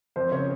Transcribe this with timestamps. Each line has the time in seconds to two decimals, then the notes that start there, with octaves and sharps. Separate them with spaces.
0.16 F2 C5
0.31 C#3 C#5